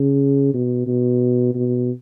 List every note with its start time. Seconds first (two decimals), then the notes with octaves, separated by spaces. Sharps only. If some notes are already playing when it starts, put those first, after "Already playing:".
Already playing: C#3
0.54 B2
0.87 B2
1.54 B2